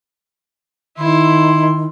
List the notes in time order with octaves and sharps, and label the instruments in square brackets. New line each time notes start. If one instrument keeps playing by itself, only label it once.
[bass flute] D#3 [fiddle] E4 C6